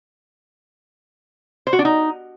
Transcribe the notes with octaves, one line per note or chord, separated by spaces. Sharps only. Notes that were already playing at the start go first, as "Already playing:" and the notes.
C5
F#4
D4
D#4